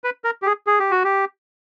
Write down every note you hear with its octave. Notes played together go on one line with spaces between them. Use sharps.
B4
A#4
G4
G#4
G#4
G4
F#4
G4